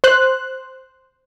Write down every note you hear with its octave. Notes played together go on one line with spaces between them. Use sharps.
C5 F#6